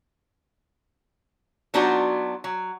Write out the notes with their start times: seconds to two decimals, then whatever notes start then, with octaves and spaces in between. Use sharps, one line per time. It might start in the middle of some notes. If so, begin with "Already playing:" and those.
1.74 F#3 B3 D4 D#4 F4 F#4
2.44 F#3